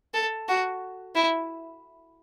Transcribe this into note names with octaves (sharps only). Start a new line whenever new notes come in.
A4
F#4
E4